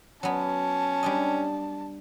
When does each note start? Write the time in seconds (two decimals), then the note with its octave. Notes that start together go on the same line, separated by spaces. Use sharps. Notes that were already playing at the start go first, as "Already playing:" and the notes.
0.23 F#3 B3 C#4 A5
1.03 G3 D4 D#5